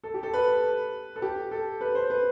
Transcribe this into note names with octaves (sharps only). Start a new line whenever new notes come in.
A4
G4
A4
B4
A4
G4
A4
B4
C5
B4